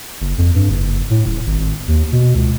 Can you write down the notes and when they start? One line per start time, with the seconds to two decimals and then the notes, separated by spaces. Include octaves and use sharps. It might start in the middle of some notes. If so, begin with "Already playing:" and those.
0.21 F#1
0.38 F2
0.55 G2
0.69 F#1
1.10 A2
1.26 D#1
1.46 G#1
1.88 D#2
2.12 B2
2.35 C#2